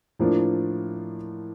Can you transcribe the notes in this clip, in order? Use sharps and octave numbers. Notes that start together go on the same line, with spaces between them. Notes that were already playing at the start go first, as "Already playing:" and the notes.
A2 F3 A#3 D4 F4